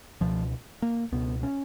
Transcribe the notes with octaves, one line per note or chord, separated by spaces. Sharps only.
C#2 B2 F3
A#3
C#2 B2 B3
C#4